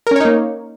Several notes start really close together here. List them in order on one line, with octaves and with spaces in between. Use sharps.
A#4 C#4 C#5 D#4 A#3